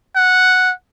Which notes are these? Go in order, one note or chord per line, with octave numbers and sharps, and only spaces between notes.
F#5